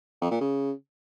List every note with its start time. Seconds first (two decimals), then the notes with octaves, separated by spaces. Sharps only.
0.21 F2
0.31 A#2
0.41 C#3